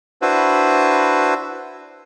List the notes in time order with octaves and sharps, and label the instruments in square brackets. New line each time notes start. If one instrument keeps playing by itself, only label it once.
[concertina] D4 E4 F#4 B4 C5